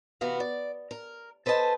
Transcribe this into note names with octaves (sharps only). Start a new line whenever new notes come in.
C3 E3 B3 F#4 F5
D5
A#4
A4 B4 C5 D#5 A5